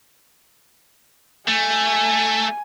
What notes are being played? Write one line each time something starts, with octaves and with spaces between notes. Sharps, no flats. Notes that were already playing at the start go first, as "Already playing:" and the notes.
A3 G#5